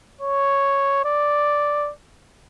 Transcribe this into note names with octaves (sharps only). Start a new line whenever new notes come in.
C#5
D5